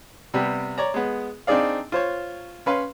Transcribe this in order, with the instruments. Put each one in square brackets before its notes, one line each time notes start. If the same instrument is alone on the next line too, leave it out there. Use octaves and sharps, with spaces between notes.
[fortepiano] C3 G3 B3
C#5 D5 A#5
G#3 B3
C4 D4 D#4 G#4 D5 F5
F4 C5 C#5
C#4 B4 F5 C6